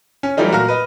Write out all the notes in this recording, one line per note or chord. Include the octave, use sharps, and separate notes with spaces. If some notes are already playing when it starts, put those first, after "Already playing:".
C#4
E3 F#3 G3 A3 D#4 F4
A#2 F#4 A#4 F5 A#5 F6
B4 D#5